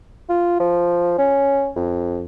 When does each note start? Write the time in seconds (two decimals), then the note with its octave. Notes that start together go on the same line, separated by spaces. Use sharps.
0.29 F4
0.60 F3
1.18 C#4
1.76 F2